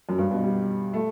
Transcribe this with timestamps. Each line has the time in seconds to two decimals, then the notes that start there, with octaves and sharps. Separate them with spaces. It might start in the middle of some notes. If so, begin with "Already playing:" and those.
0.09 F#2
0.18 G2
0.31 B2
0.44 G3
0.94 A3